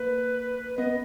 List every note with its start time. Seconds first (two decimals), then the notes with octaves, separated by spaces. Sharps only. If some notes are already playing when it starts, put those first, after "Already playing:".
Already playing: A#3 B4
0.78 B3 D#5